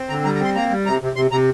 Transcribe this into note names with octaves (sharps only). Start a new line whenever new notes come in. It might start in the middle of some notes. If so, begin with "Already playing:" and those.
Already playing: C4
D3 A#5
G3 A#5
A#5
C4 C6
A#3 A#5
G3
C3 A#5
C3
C3 C6
C3 A#5